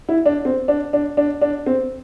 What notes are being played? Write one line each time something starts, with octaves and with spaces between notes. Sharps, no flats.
E4
D4
C4
D4
D4
D4
D4
C4